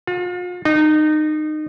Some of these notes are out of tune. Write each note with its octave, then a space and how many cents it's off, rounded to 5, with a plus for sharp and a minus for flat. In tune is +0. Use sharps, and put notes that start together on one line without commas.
F4 +40
D#4 -25